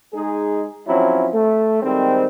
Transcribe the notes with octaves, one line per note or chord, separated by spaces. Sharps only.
G#3 D#4 G#4
F3 F#3 C4 C#4 E4
A3
D#3 G3 G#3 C4